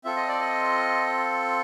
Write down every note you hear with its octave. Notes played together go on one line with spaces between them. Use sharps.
C4 F4 A4 E5
D#5
D5
D#5